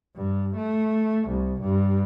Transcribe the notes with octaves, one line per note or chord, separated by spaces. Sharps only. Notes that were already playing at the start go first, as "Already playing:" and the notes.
G2
A3
C2
G2